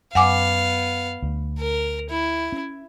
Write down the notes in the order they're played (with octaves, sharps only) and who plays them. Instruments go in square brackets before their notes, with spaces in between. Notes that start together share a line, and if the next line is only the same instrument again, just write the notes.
[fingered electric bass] F#2 [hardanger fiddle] B3 F5 [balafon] F#5 G#5 D6
[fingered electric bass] D2
[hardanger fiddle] A#4
E4
[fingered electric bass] C#4